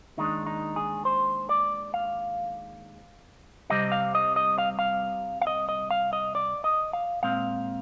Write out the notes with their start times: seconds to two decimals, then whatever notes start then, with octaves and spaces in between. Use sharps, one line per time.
0.17 D#2 D#3 G#3 D4 D#4
0.46 D#4
0.76 G#4
1.05 C5
1.49 D5
1.94 F5
3.70 C2 C3 G3 C4 D#5
3.92 F5
4.15 D#5
4.36 D#5
4.58 F5
4.79 F5
5.41 F5
5.47 D#5
5.69 D#5
5.91 F5
6.13 D#5
6.35 D5
6.64 D#5
6.93 F5
7.23 A#2 G#3 C4 F5